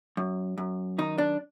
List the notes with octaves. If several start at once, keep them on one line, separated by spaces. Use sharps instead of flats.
F#2
F#2
D#3 D#4
D4